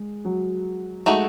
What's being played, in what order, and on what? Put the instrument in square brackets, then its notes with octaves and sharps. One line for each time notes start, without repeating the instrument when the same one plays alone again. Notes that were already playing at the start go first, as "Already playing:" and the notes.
Already playing: [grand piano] G#3
F#3
[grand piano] G#3 [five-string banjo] A3 D#4 F#4